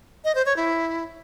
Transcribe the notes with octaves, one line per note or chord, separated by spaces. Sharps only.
D#5
C5
C#5
E4